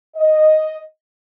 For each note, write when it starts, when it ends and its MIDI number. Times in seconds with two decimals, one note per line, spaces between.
0.17 0.79 75